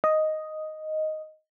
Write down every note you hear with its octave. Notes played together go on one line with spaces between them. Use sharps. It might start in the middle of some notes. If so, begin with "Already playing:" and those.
D#5